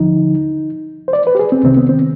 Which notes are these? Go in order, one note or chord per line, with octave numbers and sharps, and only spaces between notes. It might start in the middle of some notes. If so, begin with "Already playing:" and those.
Already playing: D#2 D3 F3 D#4
C5
D5
B4
G4
G#4
C4
C2 C3 D#3 C4
B3
C4